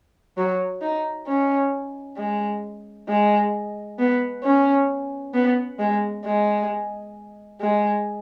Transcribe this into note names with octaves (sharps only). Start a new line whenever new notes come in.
F#3
D#4
C#4
G#3
G#3
B3
C#4
B3
G#3
G#3
G#3